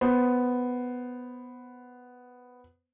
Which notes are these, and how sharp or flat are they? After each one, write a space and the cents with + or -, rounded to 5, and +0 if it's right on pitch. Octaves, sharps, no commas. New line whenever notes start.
B3 +5 C5 +0